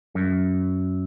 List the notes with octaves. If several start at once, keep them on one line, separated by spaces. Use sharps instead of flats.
F#2